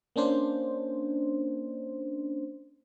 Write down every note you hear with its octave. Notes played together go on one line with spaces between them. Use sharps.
A#3 C#4 D4 C5